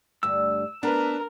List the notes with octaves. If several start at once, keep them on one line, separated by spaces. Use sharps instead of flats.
D2 G2 E6
B3 D4 A#4 B4